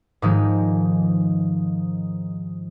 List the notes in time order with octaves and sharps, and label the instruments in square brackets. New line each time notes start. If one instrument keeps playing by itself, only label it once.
[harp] G#2 D#3 F3 G#3 D#4